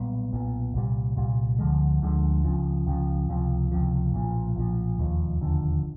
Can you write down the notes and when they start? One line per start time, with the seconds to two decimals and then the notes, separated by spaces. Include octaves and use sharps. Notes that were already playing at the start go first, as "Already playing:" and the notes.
Already playing: B1 A#2 G3 B3
0.32 B1 A#2 G3 B3
0.74 C2 A#2 G3
1.17 C2 A#2 G3
1.59 D2 D3 F3 G#3
2.02 D2 D3 F3 G#3
2.44 C#2 C#3 F3
2.87 C#2 C#3 F3
3.29 C#2 C3 F3
3.72 C#2 C3 F3
4.14 B1 A#2 F3
4.56 B1 A#2 F3
4.99 E1 D#2 D3 F3
5.41 E1 D#2 D3 F3